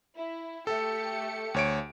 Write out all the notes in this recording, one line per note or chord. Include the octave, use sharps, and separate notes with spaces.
E4
A3 G4 A4 C#7
D2 C#5 D7